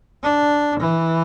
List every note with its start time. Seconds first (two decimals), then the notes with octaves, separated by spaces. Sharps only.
0.23 D4
0.80 E3